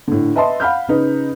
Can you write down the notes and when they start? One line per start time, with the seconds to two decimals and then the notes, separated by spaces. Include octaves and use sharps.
0.08 A2 D3
0.36 B4 D#5 E5 A5 C6
0.60 F5 F#5 B5 F6 G6
0.89 C#3 D#4 B4